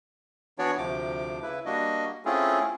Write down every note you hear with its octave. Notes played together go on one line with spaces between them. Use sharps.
E3 B3 D4 F#4 C#5 D5
D2 C3 F3 D6
C#3 E4 B4
G3 A#3 D4 F#4 D#5
A3 C4 C#4 E4 F4 G#4